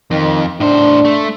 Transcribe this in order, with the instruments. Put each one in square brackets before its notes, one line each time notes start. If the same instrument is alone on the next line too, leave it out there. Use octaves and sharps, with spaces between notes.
[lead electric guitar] F2 [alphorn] D#3
[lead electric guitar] A2 C5 [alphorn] D4
[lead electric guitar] A3